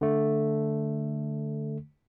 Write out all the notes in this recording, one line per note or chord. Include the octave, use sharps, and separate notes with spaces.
D3 A3